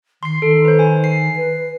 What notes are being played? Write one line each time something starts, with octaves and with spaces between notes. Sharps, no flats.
D#3 C6 C7
D#3 A4
B4 C5
G#5
C7
B4